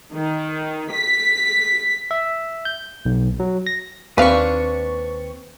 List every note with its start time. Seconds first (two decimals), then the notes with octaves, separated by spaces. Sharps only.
0.14 D#3
0.91 B6
2.11 E5
2.65 G6
3.06 B1
3.40 F#3
3.67 A#6
4.18 D#2 C4 D4 B4 F5 C#6